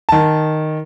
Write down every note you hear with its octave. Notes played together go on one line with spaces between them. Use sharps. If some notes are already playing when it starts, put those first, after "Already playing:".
D#3 A5